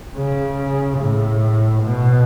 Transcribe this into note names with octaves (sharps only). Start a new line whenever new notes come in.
C#3
A2
B2